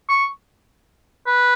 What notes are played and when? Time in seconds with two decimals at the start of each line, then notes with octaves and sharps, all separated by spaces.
0.09 C#6
1.27 B4